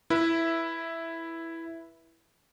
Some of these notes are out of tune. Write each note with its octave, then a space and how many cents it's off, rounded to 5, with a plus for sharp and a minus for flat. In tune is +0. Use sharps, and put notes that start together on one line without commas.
E4 +0 B4 -25 E5 +0